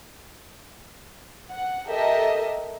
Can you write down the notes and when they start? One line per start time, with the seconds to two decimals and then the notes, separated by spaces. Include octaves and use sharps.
1.51 F#5
1.89 G4 A4 A#4 D#5 E5